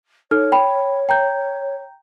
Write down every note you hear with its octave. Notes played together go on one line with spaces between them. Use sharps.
D#4 A4 C#5 F6
G5 B5
G5 A#5 G6